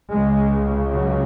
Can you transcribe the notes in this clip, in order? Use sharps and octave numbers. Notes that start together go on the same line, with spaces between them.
C#2 C#3 G#3
F#3